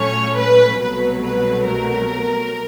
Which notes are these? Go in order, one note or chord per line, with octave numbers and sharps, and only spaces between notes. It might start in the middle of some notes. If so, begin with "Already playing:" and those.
Already playing: A#2 F#3 A3 C#4 C#5
B4
C2 B2 F#3 A3 B4
B4
A#4